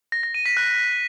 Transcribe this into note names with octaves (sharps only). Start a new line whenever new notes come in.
A#6
A#6
D#7
B6
F#6